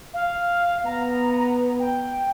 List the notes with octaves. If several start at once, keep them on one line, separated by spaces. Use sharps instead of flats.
F5
B3 A#5
G5